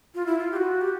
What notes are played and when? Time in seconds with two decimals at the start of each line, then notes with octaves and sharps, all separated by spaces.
0.15 F4
0.26 E4
0.39 F4
0.51 G4
0.56 F#4
0.81 G4